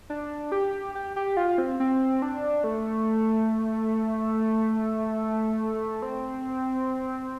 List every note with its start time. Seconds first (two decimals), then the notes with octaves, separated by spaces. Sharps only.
0.10 D4
0.52 G4
0.95 G4
1.16 G4
1.37 F4
1.58 C4
1.80 C4
2.22 D4
2.64 A3
6.02 C4